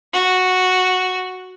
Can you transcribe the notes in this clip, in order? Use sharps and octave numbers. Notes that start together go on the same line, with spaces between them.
F#4